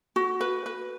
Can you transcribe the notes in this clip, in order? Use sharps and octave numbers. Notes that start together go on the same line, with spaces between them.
F#4
B4
B4